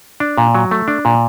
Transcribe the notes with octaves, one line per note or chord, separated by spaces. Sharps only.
D4
A#2
F#3
A3
D4
A#2